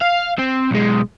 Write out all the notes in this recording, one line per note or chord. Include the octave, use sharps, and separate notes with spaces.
F5
C4
B1 G#3